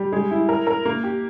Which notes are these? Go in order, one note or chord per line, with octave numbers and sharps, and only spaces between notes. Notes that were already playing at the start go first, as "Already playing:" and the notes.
Already playing: G3
G#3
E4
A#4
A#4
A#3
G4